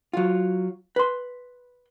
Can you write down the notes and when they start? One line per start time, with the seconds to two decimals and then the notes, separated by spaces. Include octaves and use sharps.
0.13 F#3 F4
0.96 B4 C6